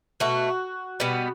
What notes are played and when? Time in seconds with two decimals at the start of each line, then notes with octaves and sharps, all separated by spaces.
0.20 B2 A3 F#4
1.00 B2 G3 B3